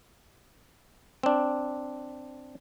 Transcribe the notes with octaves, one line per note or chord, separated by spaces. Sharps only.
C4 D4